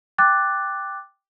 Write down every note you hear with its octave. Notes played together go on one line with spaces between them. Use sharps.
G5 D6 F#6 A6